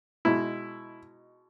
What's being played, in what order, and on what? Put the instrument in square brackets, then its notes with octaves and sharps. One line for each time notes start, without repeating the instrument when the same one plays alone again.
[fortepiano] B2 G#3 D#4 E4